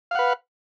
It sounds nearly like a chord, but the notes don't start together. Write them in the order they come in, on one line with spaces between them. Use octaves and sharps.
F5 F#5 B4